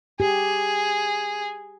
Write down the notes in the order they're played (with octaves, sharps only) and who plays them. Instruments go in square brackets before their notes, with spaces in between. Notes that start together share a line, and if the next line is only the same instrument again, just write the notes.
[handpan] G4 [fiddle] G#4